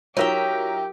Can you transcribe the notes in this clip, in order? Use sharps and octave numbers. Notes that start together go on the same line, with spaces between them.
F#3 D#4 F4 G4 A#4 C#5 E5 G5